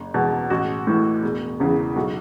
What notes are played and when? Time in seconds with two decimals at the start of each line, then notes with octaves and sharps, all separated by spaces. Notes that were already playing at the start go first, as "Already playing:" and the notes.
Already playing: F#1
0.14 E2 B2
0.50 A1 F#4
0.87 A2 E3
1.22 E1
1.60 E2 C#3 E3
1.96 B1 F#4